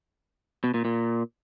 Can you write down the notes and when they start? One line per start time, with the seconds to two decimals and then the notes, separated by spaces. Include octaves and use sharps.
0.64 B2
0.74 A#2
0.85 A#2